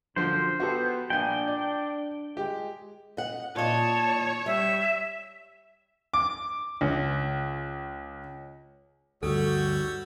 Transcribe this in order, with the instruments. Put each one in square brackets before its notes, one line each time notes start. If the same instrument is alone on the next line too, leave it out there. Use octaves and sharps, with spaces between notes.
[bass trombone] F#2 [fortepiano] D3 F3 [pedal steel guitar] C5
[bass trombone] B3 [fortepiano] F#4 G4 A4
[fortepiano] A#1 G#5 [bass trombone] D4 [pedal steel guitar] G5
[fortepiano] D5
[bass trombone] G#3 [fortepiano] G4
[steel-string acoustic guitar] D#5 F#5
[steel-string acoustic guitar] A#2 D#5 [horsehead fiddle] C#5 [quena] A5
[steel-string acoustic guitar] G3 [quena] E5
[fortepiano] D6
C#2
[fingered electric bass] D2 G2 [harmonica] G3 C#5 E6 [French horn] F#4 [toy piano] A4